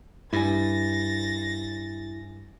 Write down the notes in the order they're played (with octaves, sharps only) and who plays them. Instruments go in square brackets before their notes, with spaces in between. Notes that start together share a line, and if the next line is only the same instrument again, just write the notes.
[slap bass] G2 [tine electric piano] E4 G#5 [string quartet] A6 A#6